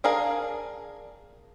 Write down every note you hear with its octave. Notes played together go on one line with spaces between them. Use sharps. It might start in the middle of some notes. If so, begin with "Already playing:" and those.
D4 G#4 A#4 F5 G#5